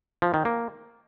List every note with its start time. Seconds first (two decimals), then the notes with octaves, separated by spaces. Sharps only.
0.22 F3
0.34 D#3
0.45 A#3